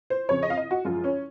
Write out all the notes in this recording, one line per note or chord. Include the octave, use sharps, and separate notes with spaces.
C5
F2 C#3 F3 C#5
D#5
F5
D#5
F#4
F#2 F3 G#3 F4
C#4